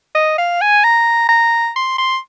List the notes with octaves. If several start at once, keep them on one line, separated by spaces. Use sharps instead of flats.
D#5
F5
G#5
A#5
A#5
C6
C6